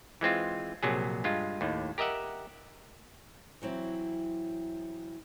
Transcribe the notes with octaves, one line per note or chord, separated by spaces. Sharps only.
E3 G#3 C4 F4
A#1 C3 F#3 G#4
G2 G#3 F4
D#2 A2
G4 A#4 D#5 E5 F#5
E3 F#3 C4 E4